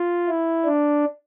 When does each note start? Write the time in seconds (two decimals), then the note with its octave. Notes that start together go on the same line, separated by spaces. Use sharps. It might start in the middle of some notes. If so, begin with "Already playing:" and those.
Already playing: F4
0.28 E4
0.65 D4